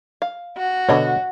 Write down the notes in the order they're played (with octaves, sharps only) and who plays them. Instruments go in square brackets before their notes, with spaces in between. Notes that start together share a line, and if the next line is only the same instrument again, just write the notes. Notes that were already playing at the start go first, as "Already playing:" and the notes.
[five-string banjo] F5
[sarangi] F#4
[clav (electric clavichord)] B2 D3 [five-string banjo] C#5 D#5 B5